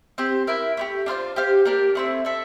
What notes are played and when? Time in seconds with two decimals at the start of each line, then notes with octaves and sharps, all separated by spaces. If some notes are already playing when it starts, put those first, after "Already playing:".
0.18 C4 G4 C5
0.47 E4 A#4 E5
0.77 A3 E4 G4
1.06 D4 F4 C5 F5
1.36 G4 C5 F5
1.65 A#3 D4 G4 A#4
1.95 A3 C4 E4
2.25 D4 A4 E5